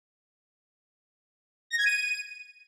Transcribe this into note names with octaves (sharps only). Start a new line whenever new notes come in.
A#6
G#6
D#7